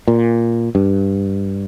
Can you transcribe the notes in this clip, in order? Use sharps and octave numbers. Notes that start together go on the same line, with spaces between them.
A#2
G2